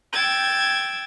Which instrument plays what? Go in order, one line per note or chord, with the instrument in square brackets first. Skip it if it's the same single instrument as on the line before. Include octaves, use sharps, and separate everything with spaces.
[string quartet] G5 E6 G#6 A6